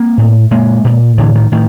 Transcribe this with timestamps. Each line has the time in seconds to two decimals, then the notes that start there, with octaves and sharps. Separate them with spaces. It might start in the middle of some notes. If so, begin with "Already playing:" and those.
Already playing: A#3 C4
0.18 A2
0.51 A#2 G#3 A#3
0.85 A#2
1.18 A2 D3 E3
1.35 D#3
1.52 A2 D#3